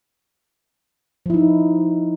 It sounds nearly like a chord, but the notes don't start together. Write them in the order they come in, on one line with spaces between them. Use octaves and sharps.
F3 E4 D#4